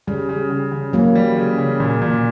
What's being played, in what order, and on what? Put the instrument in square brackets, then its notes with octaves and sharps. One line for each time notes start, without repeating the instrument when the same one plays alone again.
[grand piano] C#3 [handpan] G3
[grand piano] C#3
C#3
C#3
[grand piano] E3 [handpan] F#3 A#3
[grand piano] G3
C#3
C#3
A#2
A#2